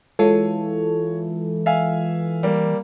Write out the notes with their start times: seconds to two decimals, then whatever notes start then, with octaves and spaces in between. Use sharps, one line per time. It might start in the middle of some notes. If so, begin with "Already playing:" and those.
0.19 E3 G#3 F4 A4 C#5
1.66 E5 F5 G#5
2.43 G3 A#3